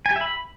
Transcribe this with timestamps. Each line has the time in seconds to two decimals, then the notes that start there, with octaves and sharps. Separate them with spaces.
0.06 G#5
0.11 G4
0.16 E5
0.21 B5